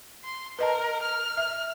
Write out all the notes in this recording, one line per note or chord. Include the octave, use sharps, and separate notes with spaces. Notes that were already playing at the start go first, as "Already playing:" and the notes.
C6
A#4 B4 D#5 A5
F6
E5